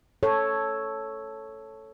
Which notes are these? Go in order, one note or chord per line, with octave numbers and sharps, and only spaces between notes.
A4 C#5